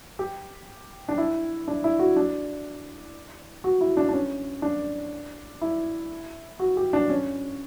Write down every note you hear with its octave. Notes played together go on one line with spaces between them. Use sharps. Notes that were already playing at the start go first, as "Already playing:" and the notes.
G4
D4
E4
D4
E4
F#4
D4
F#4
E4
D4
D4
C#4
D4
E4
F#4
G4
D4
C#4